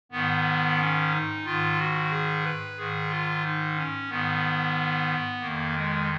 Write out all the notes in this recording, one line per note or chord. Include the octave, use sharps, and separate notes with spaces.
G#2 D#3 B3
C#4
D#4
G#2 D#3 F4
F#4
G#4
B4
G#2 D#3 G#4
F4
D#4
C#4
G#2 D#3 B3
F2 D#3 A#3
G#3